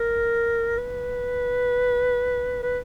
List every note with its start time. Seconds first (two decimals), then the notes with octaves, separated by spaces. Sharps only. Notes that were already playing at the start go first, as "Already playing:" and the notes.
Already playing: A#4
0.78 B4
2.63 B4